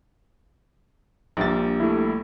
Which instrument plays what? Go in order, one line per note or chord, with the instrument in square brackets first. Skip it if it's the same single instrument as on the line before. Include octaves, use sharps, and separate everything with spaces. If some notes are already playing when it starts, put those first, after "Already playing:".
[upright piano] A#1 A#3 A6 [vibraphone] G3 D4 G4
[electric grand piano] A3 E4